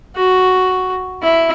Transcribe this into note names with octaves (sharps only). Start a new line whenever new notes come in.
F#4
E4